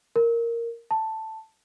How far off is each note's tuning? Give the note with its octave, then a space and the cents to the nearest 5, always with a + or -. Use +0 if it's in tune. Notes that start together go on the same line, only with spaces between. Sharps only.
A#4 -5
A5 +5